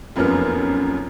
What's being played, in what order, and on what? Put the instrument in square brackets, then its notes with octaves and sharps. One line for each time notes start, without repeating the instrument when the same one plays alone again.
[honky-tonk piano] F1 F#2 F3 A#3 B3 F6